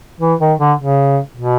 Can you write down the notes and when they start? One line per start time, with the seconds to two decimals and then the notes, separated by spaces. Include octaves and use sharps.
0.21 E3
0.40 D#3
0.59 D3
0.79 C#3
1.37 B2